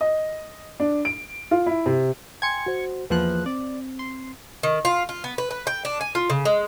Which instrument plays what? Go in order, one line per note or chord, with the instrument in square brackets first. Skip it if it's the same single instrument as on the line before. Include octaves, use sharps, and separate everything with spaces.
[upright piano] D#5
D4
D7
F4
E4
C3
[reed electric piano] G5 G#5 C6 [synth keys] G#6 C#7
[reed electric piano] F#4 C5
[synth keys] E2 F3 F#6 [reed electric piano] A#3 B4
[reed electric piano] C4 [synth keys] D5
[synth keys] C6
[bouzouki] D#3
F4
F4
B3
B4
B4
G5
D4
G#5
F4
C#3
G#3